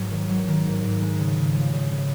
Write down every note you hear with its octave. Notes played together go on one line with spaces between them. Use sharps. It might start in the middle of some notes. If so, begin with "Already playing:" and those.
Already playing: G#2 F#3 B3
D#3
F#3
D#3
G#2
G#2
G#3
C#3
C#3
F3
C#3
C#3